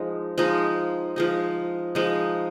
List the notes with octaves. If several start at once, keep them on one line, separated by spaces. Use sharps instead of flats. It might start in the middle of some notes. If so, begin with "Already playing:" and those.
Already playing: F3 G#3 D#4
F3 G#3 D#4
F3 G#3 D#4
F3 G#3 D#4